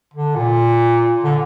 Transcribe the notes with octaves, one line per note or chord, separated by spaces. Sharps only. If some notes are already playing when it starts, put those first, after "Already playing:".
D3
A#2
D3